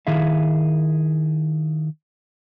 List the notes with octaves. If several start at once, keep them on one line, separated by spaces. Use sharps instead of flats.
D#3 E4 G#4 E5 F5